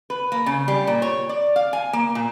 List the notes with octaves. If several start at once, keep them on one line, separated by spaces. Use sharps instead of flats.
B4
A#3
C#3
G3
A#2
C#5
D5
F5
G#5
A#3
A#2